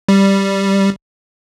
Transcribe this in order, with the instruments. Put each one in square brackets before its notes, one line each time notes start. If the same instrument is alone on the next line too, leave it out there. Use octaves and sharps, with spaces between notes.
[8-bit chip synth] G3